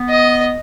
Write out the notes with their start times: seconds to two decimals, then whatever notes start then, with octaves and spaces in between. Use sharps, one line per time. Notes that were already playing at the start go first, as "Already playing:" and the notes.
Already playing: B3
0.09 D#5